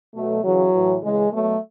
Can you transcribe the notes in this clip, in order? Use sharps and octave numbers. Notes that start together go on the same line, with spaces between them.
B2 F#3 A3
C#3 E3 F#3
A2 E3
C#3 E3 G#3
B2 F#3 A3